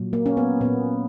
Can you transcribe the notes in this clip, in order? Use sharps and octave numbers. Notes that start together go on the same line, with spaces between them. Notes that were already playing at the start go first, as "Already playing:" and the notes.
Already playing: A#2 F#3
A#3
C#4
B3
A#2 A#3 B3